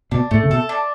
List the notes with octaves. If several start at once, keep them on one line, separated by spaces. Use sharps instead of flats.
B2 D4
A2 A3
C#3
B2 A4
D4